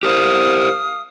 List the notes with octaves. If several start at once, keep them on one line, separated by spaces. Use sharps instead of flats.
G4 A#4 C5 F5 D#6 F6